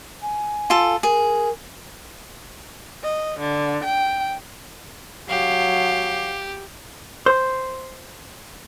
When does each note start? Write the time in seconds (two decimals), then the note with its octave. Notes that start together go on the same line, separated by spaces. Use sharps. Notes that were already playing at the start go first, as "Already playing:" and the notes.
0.22 G#5
0.70 F4 A4
1.03 G#4 A#4
3.03 D#5
3.39 D3
3.84 G5
5.30 F#3 G4 F5
7.26 C5